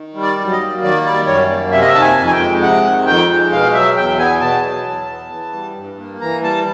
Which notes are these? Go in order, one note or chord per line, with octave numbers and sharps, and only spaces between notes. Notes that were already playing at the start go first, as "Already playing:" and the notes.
Already playing: D#3
G3
D5
F#2
D#5
A#3
D#3 D5
G3 D5
F#2 C#5
A#3
C3 E5
D#5
E5
D#3 A5
G#5
F2
G#5
G5
G#3
C3 F#5
D#3
F2 G5
G#3
B2 F5
F#3 E5
E2 G5
B3 G#5
B2 A5
F#3
E2
B3
E3
G3
G2
A#3
E3 A#5
G3 A5